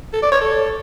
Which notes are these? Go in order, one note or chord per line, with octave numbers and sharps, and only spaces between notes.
A4
D5
C#5
A4